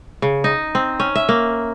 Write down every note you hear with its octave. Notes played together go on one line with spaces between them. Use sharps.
C#3
D#4
C4
C#4
E5
A#3